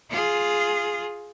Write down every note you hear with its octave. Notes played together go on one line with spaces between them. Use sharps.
F4 G#4